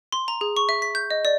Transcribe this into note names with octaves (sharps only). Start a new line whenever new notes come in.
C6
A#5
G#4
C#6
E5
B6
G6
D#5
D5